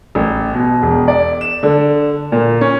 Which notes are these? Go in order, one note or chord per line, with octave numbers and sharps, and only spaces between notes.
A1
B2
E1
D5
E7
D3
A#2
C#4